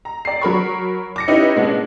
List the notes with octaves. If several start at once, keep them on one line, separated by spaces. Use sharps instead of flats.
A#5
D5 C7
F#3 A#4 B5 C#6
D6 A#6 C#7
C#4 D#4 E4 G4 B4
A#2 G#3 B3 C#4 D4